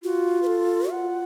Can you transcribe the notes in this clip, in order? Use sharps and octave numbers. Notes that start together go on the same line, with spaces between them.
F4 F#4
B4
A4
F#4
F4 F#5